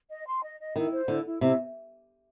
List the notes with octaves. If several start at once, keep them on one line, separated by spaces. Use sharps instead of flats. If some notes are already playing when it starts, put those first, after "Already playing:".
D#5
C6
D#5
D#5
D#3 E4
C5
D3 E4
E4
C3 E4